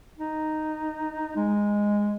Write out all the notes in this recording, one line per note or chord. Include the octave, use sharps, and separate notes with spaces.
D#4
G#3